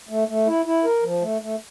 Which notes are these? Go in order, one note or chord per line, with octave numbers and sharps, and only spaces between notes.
A3
A3
E4
E4
A#4
F3
A3
A3